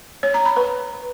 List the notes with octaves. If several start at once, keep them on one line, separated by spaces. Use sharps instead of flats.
C#5
A#5
B5
B4